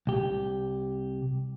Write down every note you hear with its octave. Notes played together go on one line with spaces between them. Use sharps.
C2 G4